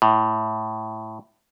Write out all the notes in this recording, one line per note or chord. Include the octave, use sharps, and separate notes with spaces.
A2